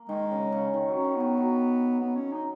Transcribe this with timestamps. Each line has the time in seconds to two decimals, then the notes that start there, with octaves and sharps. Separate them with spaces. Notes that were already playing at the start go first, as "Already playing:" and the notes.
Already playing: A#3
0.09 D#3 G#3
0.31 C#3
0.52 C#3
0.74 D#3
0.89 F#3
0.94 C#4
1.04 D#3
1.16 D#3 B3
1.37 F#3
2.00 B3
2.16 C#4
2.33 D#4